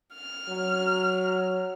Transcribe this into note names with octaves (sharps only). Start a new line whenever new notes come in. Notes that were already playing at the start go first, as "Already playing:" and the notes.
F6
F#3